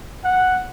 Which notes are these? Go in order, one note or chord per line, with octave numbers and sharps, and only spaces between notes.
F#5